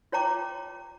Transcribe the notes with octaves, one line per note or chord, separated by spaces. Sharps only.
F4 C#5 G5 A#5 D6